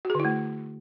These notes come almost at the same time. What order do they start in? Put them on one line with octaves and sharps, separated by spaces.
F#4 G#4 D3 E4 A3